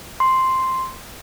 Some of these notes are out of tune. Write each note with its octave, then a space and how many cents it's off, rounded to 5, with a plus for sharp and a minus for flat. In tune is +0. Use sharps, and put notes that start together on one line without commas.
C6 +0